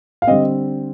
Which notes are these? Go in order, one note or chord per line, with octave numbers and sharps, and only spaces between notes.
F5
D3 G3 C4 D#5